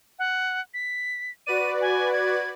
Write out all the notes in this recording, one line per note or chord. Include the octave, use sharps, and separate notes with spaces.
F#5
B6
F#4 B4 D5 D#7
G#5
G#6